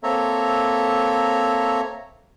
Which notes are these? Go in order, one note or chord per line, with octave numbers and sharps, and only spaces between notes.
A#3 C4 A4 C#5 E5 A#5